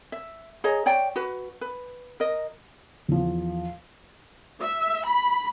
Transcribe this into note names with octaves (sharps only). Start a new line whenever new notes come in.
E5
G#4 C#5 D#5 A#5
C#5 D5 G5
F#4 B4
B4
A#4 D#5
E2 F3
E5
B5